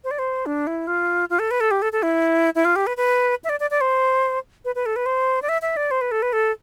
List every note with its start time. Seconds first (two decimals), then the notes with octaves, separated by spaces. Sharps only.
0.04 C5
0.11 D5
0.19 C5
0.46 D4
0.67 E4
0.87 F4
1.30 F4
1.39 A4
1.51 B4
1.60 A4
1.71 G4
1.82 A4
1.93 A4
2.03 E4
2.55 E4
2.65 F4
2.76 G4
2.87 B4
2.97 B4
3.44 E5
3.49 D5
3.60 D5
3.71 D5
3.81 C5
4.65 B4
4.75 B4
4.86 A4
4.96 B4
5.06 C5
5.42 D5
5.49 E5
5.62 E5
5.77 D5
5.91 C5
6.01 B4
6.11 A4
6.22 B4
6.33 A4